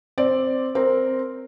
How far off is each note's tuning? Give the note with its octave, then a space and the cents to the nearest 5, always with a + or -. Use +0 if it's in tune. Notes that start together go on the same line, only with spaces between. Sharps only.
C4 +0 D5 +0
C4 +0 A#4 +0